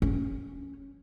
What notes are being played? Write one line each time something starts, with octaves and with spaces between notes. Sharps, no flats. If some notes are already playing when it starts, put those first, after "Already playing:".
C#4